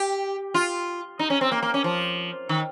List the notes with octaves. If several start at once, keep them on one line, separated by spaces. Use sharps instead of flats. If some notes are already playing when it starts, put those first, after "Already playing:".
Already playing: G4
F4
D#4
C#4
C4
A#3
A#3
C#4
F3
D#3